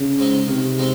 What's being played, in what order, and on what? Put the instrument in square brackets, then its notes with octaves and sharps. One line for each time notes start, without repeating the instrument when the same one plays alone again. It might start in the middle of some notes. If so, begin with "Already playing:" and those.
Already playing: [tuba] C#3
[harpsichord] G#3 C4 D#4
[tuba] C3 [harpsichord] D#3
[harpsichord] G#3 C4 D#4